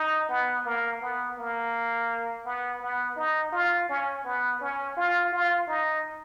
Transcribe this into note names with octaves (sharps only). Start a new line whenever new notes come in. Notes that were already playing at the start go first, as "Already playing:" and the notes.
Already playing: D#4
B3
A#3
B3
A#3
B3
B3
D#4
F4
C#4
B3
C#4
F4
F4
D#4